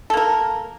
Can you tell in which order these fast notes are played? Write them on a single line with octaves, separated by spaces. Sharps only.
A4 A#3 A#4